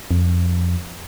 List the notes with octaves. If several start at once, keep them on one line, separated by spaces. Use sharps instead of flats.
F2